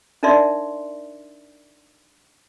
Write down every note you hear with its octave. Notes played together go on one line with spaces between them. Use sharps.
D4 D#4 A#4 D5 E5 C6